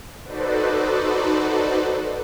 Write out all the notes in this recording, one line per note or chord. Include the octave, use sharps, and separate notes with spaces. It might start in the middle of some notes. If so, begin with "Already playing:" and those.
D#4 F#4 A4 B4 C5 D5